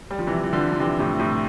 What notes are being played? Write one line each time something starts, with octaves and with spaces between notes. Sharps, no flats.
G3
F3
C3 E3
E3
D3 F3
F3
C3 E3
A2 C3
A2 C3